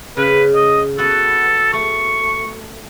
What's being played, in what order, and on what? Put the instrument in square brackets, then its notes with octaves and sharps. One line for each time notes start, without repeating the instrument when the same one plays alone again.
[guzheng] C#3 [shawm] B4
[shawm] D#5
[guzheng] B3 F#4 [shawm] A4
[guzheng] A3 [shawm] C#6